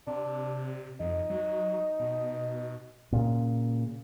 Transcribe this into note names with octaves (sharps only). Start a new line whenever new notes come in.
C3 D4
F2 D#4
F#3
B2
A#2 C#3